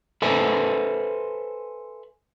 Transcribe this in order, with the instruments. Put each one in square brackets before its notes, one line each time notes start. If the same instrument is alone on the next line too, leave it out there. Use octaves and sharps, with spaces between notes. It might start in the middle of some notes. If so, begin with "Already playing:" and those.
[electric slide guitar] A4 B4 C5 E5 G#5